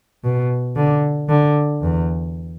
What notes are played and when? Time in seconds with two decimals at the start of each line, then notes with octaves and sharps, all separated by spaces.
0.24 B2
0.76 D3
1.29 D3
1.82 E2